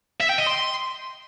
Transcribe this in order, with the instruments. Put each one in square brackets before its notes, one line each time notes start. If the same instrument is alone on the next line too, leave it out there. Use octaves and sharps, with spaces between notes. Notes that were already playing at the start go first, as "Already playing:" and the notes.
[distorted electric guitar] E5
G5
D#5
C6